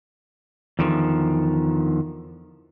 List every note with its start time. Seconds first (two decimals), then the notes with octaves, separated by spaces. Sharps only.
0.79 E2 D3 D#3 F3